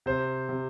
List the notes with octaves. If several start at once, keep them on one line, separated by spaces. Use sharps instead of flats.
C3 C5
C3